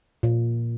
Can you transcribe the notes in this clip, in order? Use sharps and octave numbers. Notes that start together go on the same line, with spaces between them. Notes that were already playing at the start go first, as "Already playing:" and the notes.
A#2